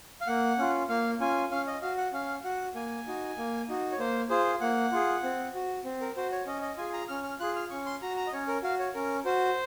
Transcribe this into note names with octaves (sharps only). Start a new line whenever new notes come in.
F5
A#3 F#5
C#4 F4
A#3 F5
C#4 F4 G#5
C#4 F5
D#5
F#4 F5
F#5
C#4 F5
F#4 F#5
A#3 G#5
D#4 F#4
A#3
D#4 F#4
C#5
A#3 C5
F4 G#4 C5
A#3 F#5
F4 G#4
C4
F#4
C4
A#4
F#4 C5
C#5
C#4 D#5
D#5
F4 G#4 G#5
A#5
C#4 F6
F6
F4 G#4 F#6
F6
C#4 C#6
C6
F#4 A#5
A#5
D#5
C#4 C#5
A#4
F#4 F5
C#5
C#4 A#4
F#4 C5